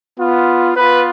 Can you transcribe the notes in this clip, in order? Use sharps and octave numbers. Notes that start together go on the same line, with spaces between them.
B3 F4
B3 F4 B4